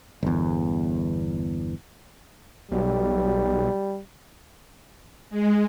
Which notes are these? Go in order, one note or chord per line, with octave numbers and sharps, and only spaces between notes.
G1 E2
B1 G3
G#3